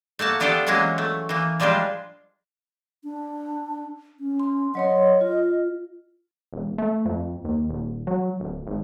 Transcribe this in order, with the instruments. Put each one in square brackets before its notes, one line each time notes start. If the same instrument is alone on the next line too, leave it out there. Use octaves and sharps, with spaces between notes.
[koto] A3 A#3 F#4 A5
B3 D4 F4 G4 A4 C5
E3 F#3 G#3 A#3 C#4
A3
E3 A#3
F3 G3 G#3 D4 F4
[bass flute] D4
C#4
[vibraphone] C6
[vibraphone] F#3 C#5 C6 [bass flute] D#5
[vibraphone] F4
[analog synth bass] E1
A3
F2
D#2
D#1
F#3
D1
G#1